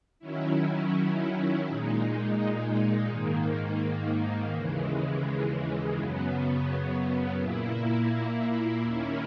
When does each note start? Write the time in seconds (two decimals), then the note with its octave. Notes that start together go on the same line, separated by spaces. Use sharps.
0.19 D#3 F#3 C#4 E4
1.64 A#2 G#3 D#4
3.07 G#2 D#3 A#3
4.51 D#2 C#3 E3 G#3
5.94 F#2 C#3 F#3 B3
7.39 A#2 A#3 E4
8.82 D#2 D#3 A#3 C#4 E4